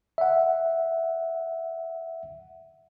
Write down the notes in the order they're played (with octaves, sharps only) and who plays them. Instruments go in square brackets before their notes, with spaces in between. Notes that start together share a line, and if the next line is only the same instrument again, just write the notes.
[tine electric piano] E5 F#5